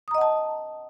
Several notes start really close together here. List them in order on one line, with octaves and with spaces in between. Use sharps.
D#6 A#5 D#5 F#5 A5